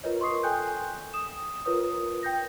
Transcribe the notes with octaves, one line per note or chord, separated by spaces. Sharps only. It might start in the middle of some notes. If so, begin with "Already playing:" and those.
F4 A#4 B4 C#5 D#5
C6 C#6 D#6 C7
A4 G5 G#5 F#6 G6
D#6 E7
F4 A#4 B4 C#5 D#6
G5 G6 A#6